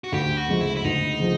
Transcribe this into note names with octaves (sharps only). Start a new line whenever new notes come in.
F#4
D2 G4
F#4
C#3 F3 G#3
E4
E4
D2 D#4
C#3 F3